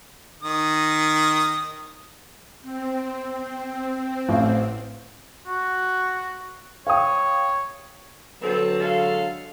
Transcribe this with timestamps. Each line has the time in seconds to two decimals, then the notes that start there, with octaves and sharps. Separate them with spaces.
0.43 D#3 D#6
2.62 C4
4.29 A1 F5
5.47 F#4
6.87 C#5 F5 G5 D#6
8.42 D3 F#3 B3 C4 A4
8.80 G#3 A4 F5